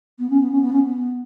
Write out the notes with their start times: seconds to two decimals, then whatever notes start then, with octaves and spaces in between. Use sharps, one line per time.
0.19 B3
0.30 C#4
0.40 B3
0.51 C#4
0.61 B3
0.72 C#4
0.83 B3